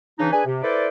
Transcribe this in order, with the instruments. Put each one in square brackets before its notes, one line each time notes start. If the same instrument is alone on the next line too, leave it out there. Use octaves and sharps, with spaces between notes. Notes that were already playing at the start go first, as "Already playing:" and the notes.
[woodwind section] C#3 E3 D4 D#4
D4 G#4 B4 G#5
C3
E4 A4 B4 C5 D5